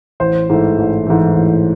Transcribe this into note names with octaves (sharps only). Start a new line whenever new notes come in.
A1 C5
G#2 E3 A3
A1
G#2 E3 A3
A1